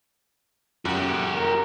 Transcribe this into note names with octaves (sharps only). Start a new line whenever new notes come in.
F#2 F#4 G4
A#4